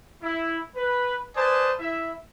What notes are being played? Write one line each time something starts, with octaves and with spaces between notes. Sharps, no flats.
E4
B4
B4 C5 D5 G#5 A5 D#6
E4 E5